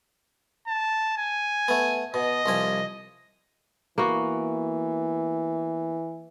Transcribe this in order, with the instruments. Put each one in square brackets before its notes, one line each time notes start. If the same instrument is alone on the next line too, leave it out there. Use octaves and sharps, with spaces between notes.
[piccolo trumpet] A5
G#5
[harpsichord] A3 B3
[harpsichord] B2 [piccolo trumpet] D#5
[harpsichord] C2 F3 G#5
[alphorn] E3 [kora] A#3 B3 F#4